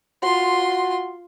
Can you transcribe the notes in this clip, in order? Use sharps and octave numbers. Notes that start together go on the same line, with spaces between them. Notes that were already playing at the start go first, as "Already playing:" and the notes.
F4 F#4 C6